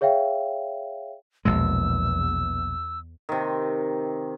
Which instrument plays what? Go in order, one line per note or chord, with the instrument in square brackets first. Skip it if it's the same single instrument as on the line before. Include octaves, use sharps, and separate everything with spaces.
[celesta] G#4 C#5 E5 F5 G5
[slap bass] A#1 B2 G#3 [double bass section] E2 [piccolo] E6
[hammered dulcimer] C3 D#3